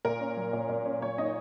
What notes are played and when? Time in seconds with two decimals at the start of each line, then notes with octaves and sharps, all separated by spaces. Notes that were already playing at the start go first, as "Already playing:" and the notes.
0.05 A#2 A#4
0.20 C#4
0.37 F#3
0.53 A#2
0.69 A#2
0.86 C#4
1.02 A#2 C#5
1.18 D#4 D#5